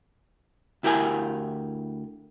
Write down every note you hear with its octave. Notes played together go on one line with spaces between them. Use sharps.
D2 E4 G4 A#4 G#5